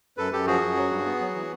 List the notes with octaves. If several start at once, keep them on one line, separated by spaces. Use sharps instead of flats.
F#2 A4 B4
F#2 G4 A4
F3 F#4 G#4
F#2
F#3
G2
B3
F#3
E3